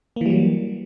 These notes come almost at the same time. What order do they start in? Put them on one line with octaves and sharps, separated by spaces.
A#3 E3 G3 F#3